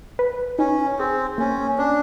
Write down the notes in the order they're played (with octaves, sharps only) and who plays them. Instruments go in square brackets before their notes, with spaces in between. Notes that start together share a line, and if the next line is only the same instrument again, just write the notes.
[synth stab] B4
[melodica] C#4 [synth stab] D#4
[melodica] C4 [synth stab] G#4
[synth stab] A#3 [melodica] C#4
[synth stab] C#4 [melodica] D4